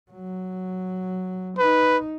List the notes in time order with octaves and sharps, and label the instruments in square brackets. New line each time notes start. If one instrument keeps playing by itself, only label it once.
[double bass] F#3
[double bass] D#4 [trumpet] B4